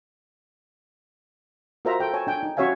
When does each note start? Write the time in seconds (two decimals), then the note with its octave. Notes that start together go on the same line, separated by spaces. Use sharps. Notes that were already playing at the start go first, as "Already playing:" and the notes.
1.85 F4 F#4 A#4 C5 E5 A#5
2.00 A4 G5
2.14 C#5 G#5 A5
2.27 D4 G5 G#5
2.43 D#4
2.57 C#4 F#4 C#5 E5 F5 G#5